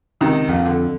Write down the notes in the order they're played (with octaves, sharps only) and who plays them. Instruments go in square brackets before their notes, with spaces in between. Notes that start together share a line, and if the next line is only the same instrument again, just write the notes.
[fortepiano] C#2 C3 D#3
[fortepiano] A#1 [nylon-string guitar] F2
[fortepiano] D3